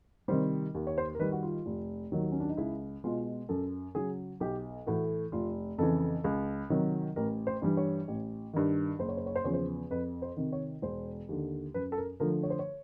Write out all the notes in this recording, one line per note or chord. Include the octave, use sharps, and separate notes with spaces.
C3 D#3 G3 C5
D#2
C#5
C5
A#4
D#3 G3 B4
F#4
F4
F1
D#2 D#3 F#3
C#4
D4
D#4
C#2 E4
B2 G#3 F4
F#2 A4
C#3 F#3 G#4
B1 G4
A2 E3 A3 F#4
F1 F4
F2 C#3 E3 A4
C#2
C3 D#3 F#3
A1 A#4
C5
G2 E3 G3
C#5
A1
G2 D#3
F#1 C5
C#5
C5
C#5
C5
E2 C#3 F3 C#5
C5
F2 B4
C5
C3 D#3
C#5
E1 C5
D#2 D3
F#2 B4
A4
A#4
D3 F3 A3 A#4
C#5
C5
C#5